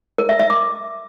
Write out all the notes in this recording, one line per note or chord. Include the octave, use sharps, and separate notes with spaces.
A#4
E5
E5
D6